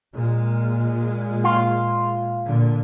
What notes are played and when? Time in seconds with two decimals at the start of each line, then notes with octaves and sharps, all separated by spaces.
0.14 A#2 G#3
1.44 F4
2.45 A#2 D3